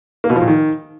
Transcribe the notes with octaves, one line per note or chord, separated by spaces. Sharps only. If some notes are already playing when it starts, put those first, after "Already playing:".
A#3
B2
F3
A#2
D#3